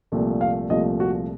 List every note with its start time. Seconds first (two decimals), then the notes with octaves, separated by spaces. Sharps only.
0.12 C2 A#2 F3 A3
0.41 F5
0.70 C2 A#2 F3 A3 D#5
1.00 F#4